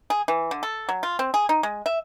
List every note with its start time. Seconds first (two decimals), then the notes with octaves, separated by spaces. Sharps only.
0.10 G#4
0.28 E3
0.51 D3
0.63 A4
0.89 F#3
1.03 F4
1.19 C4
1.34 G#4
1.49 D#4
1.63 G#3
1.86 E5